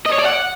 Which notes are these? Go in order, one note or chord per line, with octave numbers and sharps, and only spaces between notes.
D#5
C#5
D5
F#5